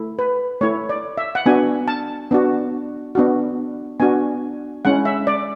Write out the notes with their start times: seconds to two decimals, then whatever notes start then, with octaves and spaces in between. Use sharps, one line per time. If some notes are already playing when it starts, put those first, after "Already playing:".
Already playing: A3 E4
0.19 B4
0.61 A3 E4 C#5
0.89 D5
1.18 E5
1.35 F#5
1.46 B3 D4 F#4 G#5
1.88 A5
2.31 B3 D4 F#4
3.15 B3 D4 F#4
4.00 B3 D4 F#4 G#5
4.85 G#3 C#4 E4 F#5
5.05 E5
5.27 D5